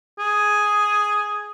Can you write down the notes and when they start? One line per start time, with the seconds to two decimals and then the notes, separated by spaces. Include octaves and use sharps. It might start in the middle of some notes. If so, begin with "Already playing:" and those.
0.19 G#4